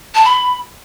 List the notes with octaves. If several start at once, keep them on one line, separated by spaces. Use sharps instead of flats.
A5
B5